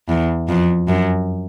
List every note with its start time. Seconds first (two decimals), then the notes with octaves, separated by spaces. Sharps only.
0.09 E2
0.48 F2
0.88 F#2